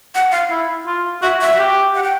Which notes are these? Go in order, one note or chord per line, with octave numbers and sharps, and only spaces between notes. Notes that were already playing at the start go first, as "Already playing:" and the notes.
F#5
F5
E4
F4
F#4 E5
F#4 E5
F#4
G4
F#5
G5